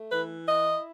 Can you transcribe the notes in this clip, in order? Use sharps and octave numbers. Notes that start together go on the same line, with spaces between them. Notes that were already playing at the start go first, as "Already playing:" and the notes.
Already playing: A3
E3 B4
E4 D#5